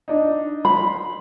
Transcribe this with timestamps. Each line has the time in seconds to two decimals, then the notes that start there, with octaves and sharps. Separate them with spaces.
0.08 D4 D#4
0.65 B5 C6